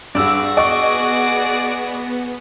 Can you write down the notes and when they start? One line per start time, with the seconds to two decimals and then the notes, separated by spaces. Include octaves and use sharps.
0.15 G2 F#4 G#4 D5 E6
0.57 B3 D5 D#5 C#6